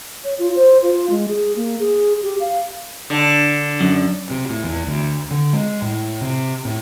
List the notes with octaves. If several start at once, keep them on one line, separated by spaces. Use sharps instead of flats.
C#5
F4
C5
F4
G#3
G#4
A#3
G#4
G4
F5
D3
F#2
C3
A2
E2
D2
D3
G#3
A2
C3
A2